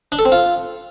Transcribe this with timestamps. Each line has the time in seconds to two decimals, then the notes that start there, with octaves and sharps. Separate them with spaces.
0.12 D4
0.19 A4
0.25 C4
0.32 F4